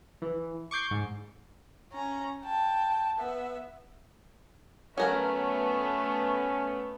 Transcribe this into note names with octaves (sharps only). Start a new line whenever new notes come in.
E3
C#6 D6 G6 C7
G#2
C#4 A#5
G5 A5
B3 E5
F#3 A3 B3 C#4 A#4 F#5